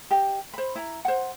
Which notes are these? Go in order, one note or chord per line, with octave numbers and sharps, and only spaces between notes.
G4 D#5
C5 B5
E4 A#5
C5 F#5